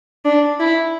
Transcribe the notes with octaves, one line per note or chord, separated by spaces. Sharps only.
D4
E4